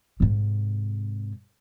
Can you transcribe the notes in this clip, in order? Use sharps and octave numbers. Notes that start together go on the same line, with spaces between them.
G#2 C3